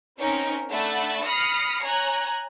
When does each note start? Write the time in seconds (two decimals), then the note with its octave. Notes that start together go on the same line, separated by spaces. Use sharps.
0.18 C4 C#4 D#4 A#4
0.70 A3 D4 E5 F#5 B5 A6
1.25 B5 D#6 F6 A#6 C7 C#7
1.83 C#5 G#5 A#5 F#6